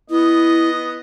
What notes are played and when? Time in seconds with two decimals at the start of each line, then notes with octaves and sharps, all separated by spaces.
0.10 B3 E4 D#5